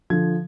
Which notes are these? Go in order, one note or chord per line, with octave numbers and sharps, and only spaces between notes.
D3 F3 G#6